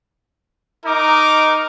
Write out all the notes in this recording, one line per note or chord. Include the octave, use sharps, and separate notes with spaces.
D#4 A#4 D6